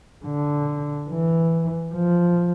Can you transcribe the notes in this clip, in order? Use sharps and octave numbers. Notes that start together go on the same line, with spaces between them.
D3
E3
F3